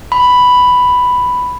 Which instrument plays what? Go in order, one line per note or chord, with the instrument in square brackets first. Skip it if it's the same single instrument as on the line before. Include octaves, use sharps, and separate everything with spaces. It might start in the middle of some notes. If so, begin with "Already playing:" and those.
[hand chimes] B5